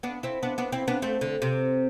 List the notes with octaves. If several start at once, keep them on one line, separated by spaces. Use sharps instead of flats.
B3 D4
C4 E4
B3 D4
B3 D4
C4 E4
B3 D4
A3 C4
D3
C3